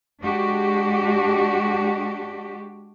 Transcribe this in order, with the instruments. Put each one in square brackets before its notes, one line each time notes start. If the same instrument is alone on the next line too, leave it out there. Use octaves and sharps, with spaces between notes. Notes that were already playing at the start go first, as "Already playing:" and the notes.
[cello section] G#3 D4 F#4 G4